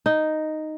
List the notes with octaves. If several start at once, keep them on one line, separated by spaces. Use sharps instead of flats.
D#4